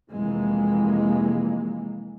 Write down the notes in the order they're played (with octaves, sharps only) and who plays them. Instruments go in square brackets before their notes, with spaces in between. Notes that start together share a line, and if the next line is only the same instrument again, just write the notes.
[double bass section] F1 E3 G#3 A#3